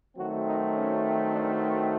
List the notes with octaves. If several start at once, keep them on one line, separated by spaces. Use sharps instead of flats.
D#3 F#3 A3 C4 F#4
D#4
C#4
D4
D#4